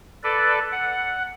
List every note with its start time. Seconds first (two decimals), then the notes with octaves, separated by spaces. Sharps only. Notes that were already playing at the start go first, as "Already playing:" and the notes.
0.23 A4 B4 D5
0.72 F#5